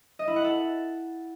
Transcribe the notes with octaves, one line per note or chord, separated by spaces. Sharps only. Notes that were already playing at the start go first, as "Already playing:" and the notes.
D#5
E4
F#5
A4